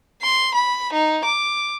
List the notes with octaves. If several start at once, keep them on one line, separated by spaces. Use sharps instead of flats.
C6
B5
D#4
D6